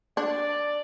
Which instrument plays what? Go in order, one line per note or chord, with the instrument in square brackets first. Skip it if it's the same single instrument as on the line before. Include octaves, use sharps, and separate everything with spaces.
[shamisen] D4 [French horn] D5